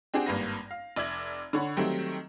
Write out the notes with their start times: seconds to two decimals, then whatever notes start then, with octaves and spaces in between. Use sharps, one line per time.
0.14 C4 D4 G4 G#4 F#5
0.26 G#1 G2 A#3 B4 A#6
0.71 F5
0.96 F1 D5 E5 G#6 F#7
1.53 D3 C#5 F#5 B5
1.77 D#3 F#3 G3 A3 C4